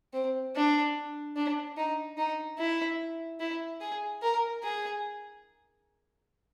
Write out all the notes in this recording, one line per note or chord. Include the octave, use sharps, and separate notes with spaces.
C4
D4
D4
D#4
D#4
E4
E4
G#4
A#4
G#4